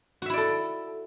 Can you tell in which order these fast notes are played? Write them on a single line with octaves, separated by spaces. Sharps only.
F#4 E5 E4 D5 A4